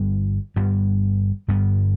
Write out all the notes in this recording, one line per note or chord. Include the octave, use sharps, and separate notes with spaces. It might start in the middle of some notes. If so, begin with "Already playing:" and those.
Already playing: G1 G2 G3 B3
G1 G2 G3 B3
G1 G2 G3 B3